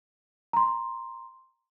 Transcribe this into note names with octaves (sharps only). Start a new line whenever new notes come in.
A#5 C6